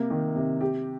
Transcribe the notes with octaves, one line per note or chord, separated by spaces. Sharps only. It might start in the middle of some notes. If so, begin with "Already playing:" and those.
Already playing: C3 A#3
D#3
C3
G4